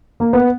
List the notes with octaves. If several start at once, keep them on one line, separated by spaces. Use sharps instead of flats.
A#3
B3